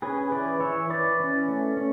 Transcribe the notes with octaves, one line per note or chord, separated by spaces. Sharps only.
C#4 G#4 B4
E3 B4 D5
E3 C#5 E5
E3 B4 D5
C#4
A3
C#4